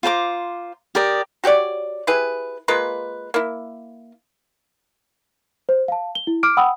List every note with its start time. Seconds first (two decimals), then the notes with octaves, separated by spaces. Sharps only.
0.03 F4 C5 A#5 D6
0.95 G4 A#4 D5 D#6
1.44 F#4 G4 C#5 D5
2.07 E4 G4 G#4 B4
2.68 G#3 A#3 F4 B4
3.34 A#3 E4
5.69 C5
5.88 F5 A5
6.15 G7
6.27 E4
6.43 D6 F6 D7
6.57 F#5 G5 B5 D#6 E6